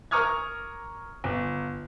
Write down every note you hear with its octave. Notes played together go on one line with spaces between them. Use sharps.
A#4 A#5 C#6 D#6 F6 G#6
G1